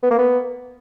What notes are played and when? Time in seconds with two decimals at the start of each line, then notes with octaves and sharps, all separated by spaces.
0.03 B3
0.11 A#3
0.18 B3